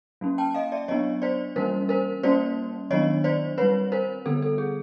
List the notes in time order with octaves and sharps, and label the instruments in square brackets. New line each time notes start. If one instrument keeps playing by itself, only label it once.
[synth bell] F#3 A#3 C#4
G5 A5
D#5 F5
D5 E5
F#3 B3 D4 C#5 D#5
C5 D5
E3 G3 A#3 C#4 A#4 C5
A#4 C5
G3 A#3 C#4 C5 D5
D#3 F#3 B3 D4 C#5 D#5
C5 D5
G3 C4 B4 C#5
A#4 C5
D3 G3 B3 A4
A4
G#4